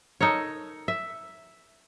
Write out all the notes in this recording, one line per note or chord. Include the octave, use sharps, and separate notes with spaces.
D#4 A4 A#4 C#5
E5